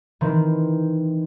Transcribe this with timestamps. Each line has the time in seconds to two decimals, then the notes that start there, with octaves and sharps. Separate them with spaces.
0.21 D#3 E3 C4